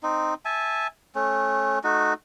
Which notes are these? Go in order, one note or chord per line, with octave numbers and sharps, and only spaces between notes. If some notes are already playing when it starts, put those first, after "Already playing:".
C4 D#4
E5 G#5 A5
A3 C#4
A3 D#4 F#4